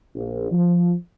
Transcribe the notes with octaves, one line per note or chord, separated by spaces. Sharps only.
A#1
F3